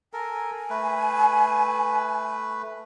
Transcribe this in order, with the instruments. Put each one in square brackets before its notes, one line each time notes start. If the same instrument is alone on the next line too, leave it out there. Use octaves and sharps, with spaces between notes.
[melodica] A4 A#4 [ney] G#5
[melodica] A3 B4